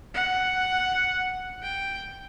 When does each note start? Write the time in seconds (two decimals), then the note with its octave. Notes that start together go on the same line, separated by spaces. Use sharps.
0.14 F#5
1.63 G5